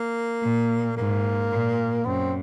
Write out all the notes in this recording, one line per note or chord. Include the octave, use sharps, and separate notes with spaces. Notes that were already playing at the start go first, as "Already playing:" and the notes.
Already playing: A#3
A#2
G#2 A#3
A#2
F#2 C4